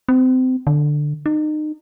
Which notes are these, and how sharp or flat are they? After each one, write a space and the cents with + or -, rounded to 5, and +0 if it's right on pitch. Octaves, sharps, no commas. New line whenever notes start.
C4 -30
D3 +10
D#4 -30